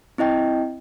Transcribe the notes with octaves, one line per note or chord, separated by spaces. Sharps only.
C4 E4 D#5 G5